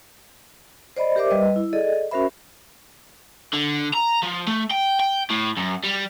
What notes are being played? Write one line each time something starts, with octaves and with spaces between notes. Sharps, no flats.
C5 D5 D#5 B5
G4 A#4 C5 D5 E5 D6
G3 B4 D#5
E4
G#4 A4 D5 D#5
C#4 F#4 A#4 C5 E5 B5
D3
A#5
F3
A3
G5
G5
A2
F#2
G3